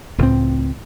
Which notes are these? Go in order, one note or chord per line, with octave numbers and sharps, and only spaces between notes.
C#2 A2 C4